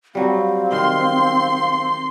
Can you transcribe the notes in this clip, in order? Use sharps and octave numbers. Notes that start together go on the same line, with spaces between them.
F#3 G3 C4 F5
D#3 C6